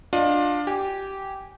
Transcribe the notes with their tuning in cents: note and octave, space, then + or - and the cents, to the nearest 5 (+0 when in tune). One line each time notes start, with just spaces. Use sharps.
D4 +10 F4 +25 D#5 +0
G4 -15 G#5 -20